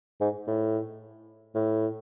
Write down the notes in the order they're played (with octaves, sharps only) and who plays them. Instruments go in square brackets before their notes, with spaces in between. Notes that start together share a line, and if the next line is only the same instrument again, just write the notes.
[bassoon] G#2
A2
A2